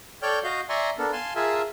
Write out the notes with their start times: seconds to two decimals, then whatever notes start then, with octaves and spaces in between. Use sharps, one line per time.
0.22 A4 C#5 D5 G5 F6 G6
0.44 F#4 D#5 F5 G6
0.69 D5 E5 G#5 A#5 C6 C#6
0.98 B3 D4 A4 A#4
1.13 F5 G#5 A5 C6
1.36 F4 G#4 A#4 E5 G#5 A5